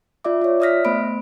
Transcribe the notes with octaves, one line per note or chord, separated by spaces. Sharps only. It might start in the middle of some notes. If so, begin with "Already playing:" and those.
F4 D5 E5 D6
F4 C#5
D5 E5 D#6 F6 A#6 B6
A3 B3 C5 B5 D7